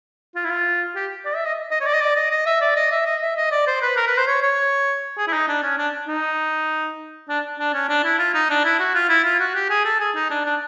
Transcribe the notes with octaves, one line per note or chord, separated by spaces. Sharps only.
F4
E4
F4
G4
D5
E5
D#5
D#5
C#5
D5
D#5
D5
D#5
D#5
E5
D5
D#5
E5
D#5
E5
D#5
D5
C5
B4
A#4
B4
C5
C#5
C#5
G#4
E4
D#4
D4
C#4
D4
D#4
D4
D4
C#4
D4
E4
F4
D#4
D4
E4
F#4
F4
E4
F4
F#4
G4
G#4
A4
G#4
D#4
D4
D4